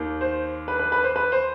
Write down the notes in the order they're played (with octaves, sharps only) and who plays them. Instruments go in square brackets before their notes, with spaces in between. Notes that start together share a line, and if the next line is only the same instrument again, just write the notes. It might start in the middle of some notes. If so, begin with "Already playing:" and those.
Already playing: [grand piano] D#2 D#3
C5
B4
B4
B4
C5
B4
C5